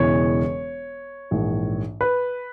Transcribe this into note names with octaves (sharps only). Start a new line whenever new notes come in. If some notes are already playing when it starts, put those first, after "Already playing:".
Already playing: E1 E2 C#3 E3 C#5
A#1 G#2 E3
B4